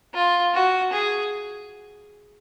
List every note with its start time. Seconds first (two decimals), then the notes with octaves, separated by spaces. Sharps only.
0.14 F4
0.54 F#4
0.93 G#4